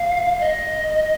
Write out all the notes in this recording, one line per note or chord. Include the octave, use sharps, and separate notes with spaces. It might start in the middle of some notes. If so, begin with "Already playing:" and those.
Already playing: F5
D#5